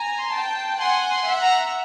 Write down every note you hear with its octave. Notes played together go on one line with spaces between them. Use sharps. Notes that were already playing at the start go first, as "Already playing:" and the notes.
Already playing: G#5 A#5
C6
G5 A5
F#5 G#5 C6
C6
E5 F#5
A#5